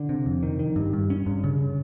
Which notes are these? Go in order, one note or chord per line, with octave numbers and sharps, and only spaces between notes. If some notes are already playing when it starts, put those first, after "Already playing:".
Already playing: D3
C3
F2
D#3
D#3
G2
G2
C#4
G2
C#3